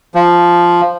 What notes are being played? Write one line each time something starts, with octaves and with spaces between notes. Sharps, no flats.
F3